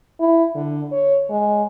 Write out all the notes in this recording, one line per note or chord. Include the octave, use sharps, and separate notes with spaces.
E4
D3
C#5
G#3